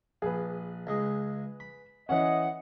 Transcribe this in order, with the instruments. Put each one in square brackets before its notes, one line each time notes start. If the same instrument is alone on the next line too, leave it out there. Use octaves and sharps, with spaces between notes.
[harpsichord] A#1 [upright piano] G#4 B4
[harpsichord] C#2 G#3 D#5
B5
[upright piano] E3 C#4 [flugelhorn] D#5 [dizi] F#5